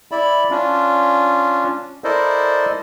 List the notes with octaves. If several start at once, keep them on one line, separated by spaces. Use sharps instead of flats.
E4 D5 E5 B5
C#4 D4 F4
E4 A4 A#4 C5 D5 D#5